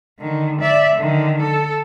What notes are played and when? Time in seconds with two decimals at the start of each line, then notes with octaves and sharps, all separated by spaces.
0.19 D3 D#3
0.61 D5 E5
0.95 D3 D#3
1.42 A4